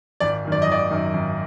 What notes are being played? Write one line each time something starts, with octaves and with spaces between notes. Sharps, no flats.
G#1 D5
F#2 D#3
D5
D#5
G#1 D5
F#2 D#3
G#1